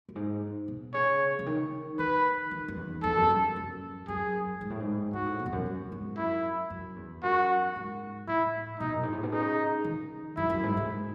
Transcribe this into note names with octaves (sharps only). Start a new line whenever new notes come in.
F#2
G#2
B2
C#3 C#5
C#3
D#3
D#3 B4
D#3
F#2
E2
E2 A4
F#2
F#2
F#2
F#2 G#4
G#2
A2
G#2
G#2 F#4
A2
B2
E2
F#2
F#2
G#2
F#2 E4
F#2
E2
F#2 F#4
G#2
A2 E4
B2 D#4
F#2
G#2
A2
B2
C#3 D#4
D#3
F#2 E4
F#2
G#2
A2
G#2